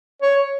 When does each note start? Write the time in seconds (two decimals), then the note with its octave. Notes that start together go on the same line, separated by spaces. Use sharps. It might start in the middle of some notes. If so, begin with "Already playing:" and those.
0.22 C#5